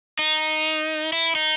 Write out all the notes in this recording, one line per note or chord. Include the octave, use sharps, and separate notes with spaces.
D#4
E4
D#4